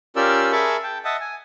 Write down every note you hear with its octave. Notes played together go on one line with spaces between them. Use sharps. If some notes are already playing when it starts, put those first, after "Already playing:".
C#4 F4 G4 A#4 D5 E6
G#4 A#4 E5 A5 B5 C#6
G5 A5
D#5 E5 F#5 A5
G#5